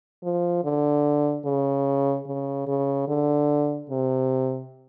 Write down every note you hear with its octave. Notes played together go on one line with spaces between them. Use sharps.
F3
D3
C#3
C#3
C#3
D3
C3